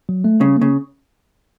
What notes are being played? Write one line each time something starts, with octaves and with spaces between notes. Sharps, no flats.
F#3
A3
C#3 G3
C#3 A#3